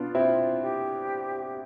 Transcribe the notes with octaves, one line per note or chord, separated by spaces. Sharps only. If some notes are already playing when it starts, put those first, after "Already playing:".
Already playing: B3 D4 F4
C4 E4
G4